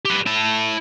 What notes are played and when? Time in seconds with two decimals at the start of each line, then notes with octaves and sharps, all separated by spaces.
0.05 G4 B4
0.26 E4 A5